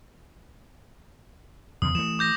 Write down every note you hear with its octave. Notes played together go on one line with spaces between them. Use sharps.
E2 C#3 D#6
E3 A3 E7
D6 G6 A#6